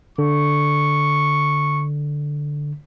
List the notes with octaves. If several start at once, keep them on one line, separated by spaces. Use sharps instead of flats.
D3 C#6